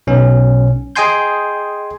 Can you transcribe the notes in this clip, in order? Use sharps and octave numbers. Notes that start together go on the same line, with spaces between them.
B1 C#4
G#4 D#5 G5 G#5 C6 G6